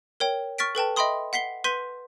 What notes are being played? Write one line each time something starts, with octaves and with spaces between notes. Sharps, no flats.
A#4 C#5 G5
C#6 F6 A6 B6 D7
A4 B4 G5 A5
D#5 E5 G5 B5 C6 D#6
F#5 B6 C7 G7
B4 C6 G6 B6 D#7